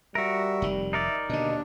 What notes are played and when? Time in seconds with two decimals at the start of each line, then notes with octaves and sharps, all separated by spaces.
0.15 G3 F#4 A#4 E5
0.62 F1 D#3
0.93 D#4 A#4 D5 E5
1.29 D#2 B2 D3 D4 D#5